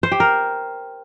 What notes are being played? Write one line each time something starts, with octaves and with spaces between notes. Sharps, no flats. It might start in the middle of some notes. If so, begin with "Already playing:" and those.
C5
G4
A#4